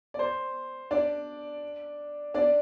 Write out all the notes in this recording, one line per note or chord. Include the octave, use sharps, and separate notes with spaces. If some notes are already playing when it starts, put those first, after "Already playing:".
D5
C5
D4 D5
D4 D5